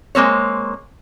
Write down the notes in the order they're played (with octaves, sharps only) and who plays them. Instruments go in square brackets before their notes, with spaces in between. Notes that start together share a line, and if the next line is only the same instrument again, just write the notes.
[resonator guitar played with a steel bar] G#3 A#3 C4 C#5